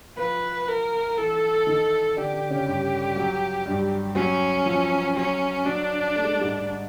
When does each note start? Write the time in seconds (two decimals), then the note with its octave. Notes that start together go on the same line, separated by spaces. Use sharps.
0.17 F3 F4 B4
0.68 A#4
1.17 E3 E4 A4
1.67 D#3 D#4
2.17 D3 D4 G4
2.33 D3 D4
2.50 C#3 C#4
2.66 G2 G3
3.16 F#3
3.66 G2 G3
4.16 F#3 C#4
4.66 F3
5.16 F#3 C#4
5.65 F#3 D4
6.16 A3
6.24 G#3
6.33 G3
6.41 G#2 G#3